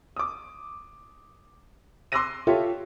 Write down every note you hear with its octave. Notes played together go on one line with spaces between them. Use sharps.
D6 D#6
C6 D6 E6 F#6 A#6 D#7
F4 G4 A4 C#5 E5